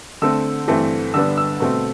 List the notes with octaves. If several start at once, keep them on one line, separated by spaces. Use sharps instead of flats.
D3 A3 C4 E6
G2 E3 A3 C4
D3 G3 B3 D4 E6
E6
B2 A3 C4